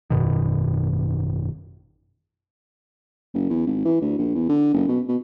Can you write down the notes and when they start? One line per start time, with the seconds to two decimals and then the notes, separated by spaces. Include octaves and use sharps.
0.10 G#1 F#2 B2 D#3
3.34 F#1
3.50 E2
3.67 G#1
3.86 E3
4.01 D2
4.18 A#1
4.35 E2
4.49 D3
4.74 F#1
4.89 B2
5.08 B2